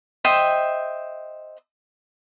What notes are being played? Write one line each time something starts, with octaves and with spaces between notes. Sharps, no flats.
C5 D#5 E5 G5